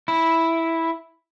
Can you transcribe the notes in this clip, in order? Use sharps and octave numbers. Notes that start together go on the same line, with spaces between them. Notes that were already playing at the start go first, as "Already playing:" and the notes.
E4